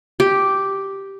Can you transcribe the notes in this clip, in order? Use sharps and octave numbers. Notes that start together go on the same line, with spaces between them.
G4